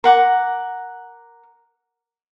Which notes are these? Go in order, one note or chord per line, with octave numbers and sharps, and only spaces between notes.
A#4 F#5 D6